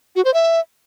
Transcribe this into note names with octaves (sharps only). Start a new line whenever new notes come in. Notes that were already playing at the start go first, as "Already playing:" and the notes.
F#4
C5
E5